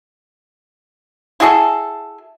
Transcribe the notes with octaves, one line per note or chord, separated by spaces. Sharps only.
E4 F#4 G#4 A4